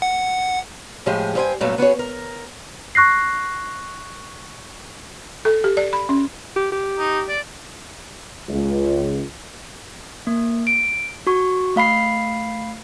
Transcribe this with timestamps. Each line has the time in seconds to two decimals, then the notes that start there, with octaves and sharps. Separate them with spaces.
0.02 F#5
1.06 A2 F3 G#3 G4 G#4
1.35 G2 G4 C5 G5 G#5
1.61 G2 A#2 F#3 A3 B3
1.78 B3 F#4 G#4 C#5
1.99 A#4
2.95 C#6 F#6 A#6 C7
5.45 A4
5.64 G4
5.77 D5
5.93 B5
6.09 C#4
6.56 G4
6.72 G4
6.98 D#4
7.28 D5
8.49 C#2
10.27 A#3
10.67 D7
11.27 F#4 C#6
11.76 A3 F5 B5 C7